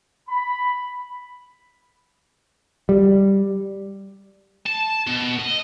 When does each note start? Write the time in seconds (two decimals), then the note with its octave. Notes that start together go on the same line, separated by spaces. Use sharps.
0.29 B5
2.89 G3
4.66 A5
5.07 B2
5.39 D#5